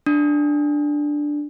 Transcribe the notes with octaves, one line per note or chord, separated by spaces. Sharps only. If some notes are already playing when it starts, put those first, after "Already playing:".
D4